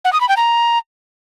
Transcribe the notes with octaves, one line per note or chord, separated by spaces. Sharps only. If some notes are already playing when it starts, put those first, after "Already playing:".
F#5
D#6
B5
G5
A#5